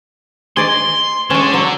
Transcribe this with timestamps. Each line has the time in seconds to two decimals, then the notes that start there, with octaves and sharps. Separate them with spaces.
0.57 G#4 D5 D#5 C6
1.30 D3 G#3 C#4
1.54 F#3